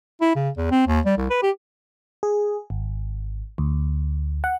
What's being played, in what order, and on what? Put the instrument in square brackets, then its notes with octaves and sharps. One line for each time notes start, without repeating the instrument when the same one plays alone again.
[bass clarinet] E4
C#3
E2
C4
D#2
G3
C2
B4
G4
[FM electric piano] G#4
G#1
D2
F#5